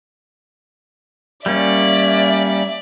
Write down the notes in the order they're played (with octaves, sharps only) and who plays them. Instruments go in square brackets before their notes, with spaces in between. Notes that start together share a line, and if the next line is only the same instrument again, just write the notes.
[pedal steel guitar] G3 A#3 C#4 [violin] D5 E5